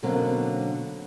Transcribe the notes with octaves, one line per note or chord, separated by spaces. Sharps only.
B2 D3 F#3 A#3 C4 C#4